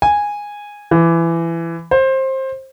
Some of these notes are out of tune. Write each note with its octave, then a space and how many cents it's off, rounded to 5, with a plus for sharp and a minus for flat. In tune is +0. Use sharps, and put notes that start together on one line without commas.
G#5 -10
E3 +20
C5 +20